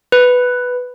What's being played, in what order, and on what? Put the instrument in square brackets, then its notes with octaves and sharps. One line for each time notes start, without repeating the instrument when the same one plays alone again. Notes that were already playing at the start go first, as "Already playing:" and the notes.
[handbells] B4